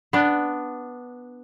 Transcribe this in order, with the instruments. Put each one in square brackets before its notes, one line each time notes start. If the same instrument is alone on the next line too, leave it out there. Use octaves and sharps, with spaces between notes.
[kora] B3 D4